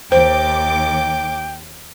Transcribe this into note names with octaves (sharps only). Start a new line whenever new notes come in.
D#2 C5 G5 D6